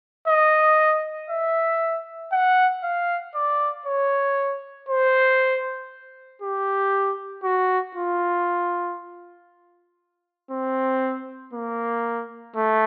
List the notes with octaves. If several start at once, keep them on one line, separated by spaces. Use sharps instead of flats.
D#5
E5
F#5
F5
D5
C#5
C5
G4
F#4
F4
C4
A#3
A3